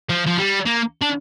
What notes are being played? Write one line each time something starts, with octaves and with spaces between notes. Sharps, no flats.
F3
F3
G3
A#3
D4